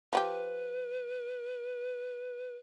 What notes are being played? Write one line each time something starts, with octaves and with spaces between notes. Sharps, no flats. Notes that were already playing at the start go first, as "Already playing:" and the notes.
F3 F#4 G4 B4